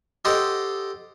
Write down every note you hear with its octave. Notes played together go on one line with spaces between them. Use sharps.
G4 A4 C5 D#5 F#5 G5